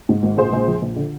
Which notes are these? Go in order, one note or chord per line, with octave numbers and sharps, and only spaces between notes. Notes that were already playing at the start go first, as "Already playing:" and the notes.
G#2
G#1
A#1 G#4 C5
A#1
F3
A#1
D3